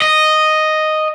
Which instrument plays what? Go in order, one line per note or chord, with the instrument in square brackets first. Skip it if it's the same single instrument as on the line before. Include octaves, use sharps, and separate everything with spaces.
[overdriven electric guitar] D#5